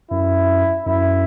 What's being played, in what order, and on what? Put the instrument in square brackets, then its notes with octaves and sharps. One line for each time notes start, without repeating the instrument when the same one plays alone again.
[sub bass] F#2 [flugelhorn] E4
[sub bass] F#2 [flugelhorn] E4